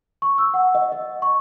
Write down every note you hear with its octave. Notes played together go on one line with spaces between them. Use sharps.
C#6
E6
F#5
D#5
D#5
C#6